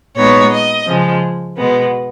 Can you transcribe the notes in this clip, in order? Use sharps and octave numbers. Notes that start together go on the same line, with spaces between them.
A#2 G#3 B3 D#4 C#5
D#5
C#3 F3 G#3
B2 G#3 B3